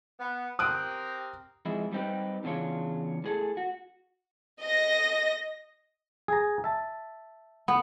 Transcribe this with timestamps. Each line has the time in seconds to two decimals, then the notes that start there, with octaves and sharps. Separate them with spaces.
0.19 B3
0.59 C4 G4 A#4 D#6 F#6 D7
1.65 F2 G#3 E4
1.92 G3 A3 C4 D#4 G4 B4
2.44 E2 C#3 D4 F4 C#5
3.24 A2 G#4 A4
3.57 F#4
4.62 D#5 A#6
6.28 G#4 A#5
6.64 E5 A5
7.68 B3